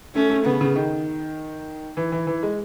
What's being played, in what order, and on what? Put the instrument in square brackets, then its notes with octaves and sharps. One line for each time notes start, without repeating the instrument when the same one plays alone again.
[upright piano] A3 [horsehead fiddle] C#4
[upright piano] A3
[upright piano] C#3 [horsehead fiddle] B3
[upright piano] C#3
D#3
E3
E3
E3
G#3